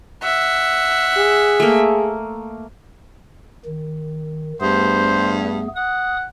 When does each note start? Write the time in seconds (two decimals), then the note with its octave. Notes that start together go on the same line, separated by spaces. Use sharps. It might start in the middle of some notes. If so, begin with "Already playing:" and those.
0.23 E5 F#5
1.17 G#4
1.60 A3 A#3
3.65 D#3
4.61 G2 A3 B3 G#4 C5
5.76 F#5 D#6